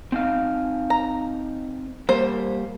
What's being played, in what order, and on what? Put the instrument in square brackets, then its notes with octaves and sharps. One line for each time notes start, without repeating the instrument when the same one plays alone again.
[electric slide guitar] C4 D#4 F5
[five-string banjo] A#5
[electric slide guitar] G3 A#3 [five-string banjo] C5